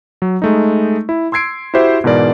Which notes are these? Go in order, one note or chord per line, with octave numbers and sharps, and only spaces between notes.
F#3
G#3 A3 D#4
E4
C6 E6 G#6 C7 D7
E4 F#4 G4 C5 E5
G#2 B2 E3 A#4 D5